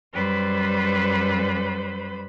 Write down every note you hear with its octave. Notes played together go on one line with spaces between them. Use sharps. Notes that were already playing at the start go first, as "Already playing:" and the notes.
F#2 G3 B4 C5 B5